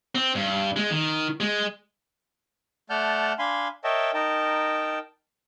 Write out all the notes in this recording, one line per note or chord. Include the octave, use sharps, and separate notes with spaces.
C4
G2
G#3
D#3
G#3
A3 D5 F#5 A5 F6 G6
D4 F5 G#5 B5 C6
A#4 C#5 D#5 E5 G5 A5
D#4 A#4 G5 A5